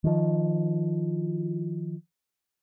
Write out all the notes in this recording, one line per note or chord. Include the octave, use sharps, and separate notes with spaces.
D#3 F3